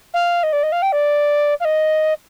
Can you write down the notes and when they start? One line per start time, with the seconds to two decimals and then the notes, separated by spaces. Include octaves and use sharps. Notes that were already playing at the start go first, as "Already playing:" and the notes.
0.13 F5
0.43 D#5
0.52 D5
0.63 D#5
0.72 F5
0.82 G5
0.92 D5
1.60 F5
1.64 D#5